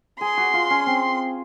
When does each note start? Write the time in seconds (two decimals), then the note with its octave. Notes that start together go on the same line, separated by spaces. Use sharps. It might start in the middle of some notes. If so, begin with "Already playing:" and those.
0.20 G#4 C6
0.37 F#4
0.53 F4
0.70 C#4
0.87 C4